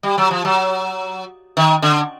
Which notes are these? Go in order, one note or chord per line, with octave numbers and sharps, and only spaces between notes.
G3
F#3
F3
F#3
D#3
D3